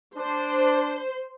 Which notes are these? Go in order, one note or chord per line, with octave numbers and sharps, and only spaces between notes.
D4 C5